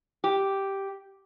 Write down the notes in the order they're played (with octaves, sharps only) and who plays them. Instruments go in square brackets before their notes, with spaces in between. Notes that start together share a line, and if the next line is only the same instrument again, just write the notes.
[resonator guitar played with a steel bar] G4